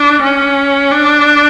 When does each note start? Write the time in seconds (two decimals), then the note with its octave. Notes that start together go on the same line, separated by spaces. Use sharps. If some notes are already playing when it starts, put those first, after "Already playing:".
Already playing: D4
0.22 C#4
0.92 D4